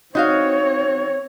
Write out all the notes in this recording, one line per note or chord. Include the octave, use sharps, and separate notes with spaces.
C4 D#4 F#4 C#5 F5